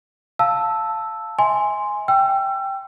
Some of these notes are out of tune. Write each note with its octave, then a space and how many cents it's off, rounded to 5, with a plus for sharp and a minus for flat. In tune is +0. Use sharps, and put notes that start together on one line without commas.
F5 +0 A5 +0 E6 +0
E5 -45 G#5 +0 C6 +0
G5 +0 E6 +35